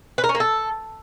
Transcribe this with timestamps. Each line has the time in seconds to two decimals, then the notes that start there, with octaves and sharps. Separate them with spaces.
0.18 B4
0.24 A#4
0.29 C#4
0.35 A#3
0.40 A4